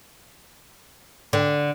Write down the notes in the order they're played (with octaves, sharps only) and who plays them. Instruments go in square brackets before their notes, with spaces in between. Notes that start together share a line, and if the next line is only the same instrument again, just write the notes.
[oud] D3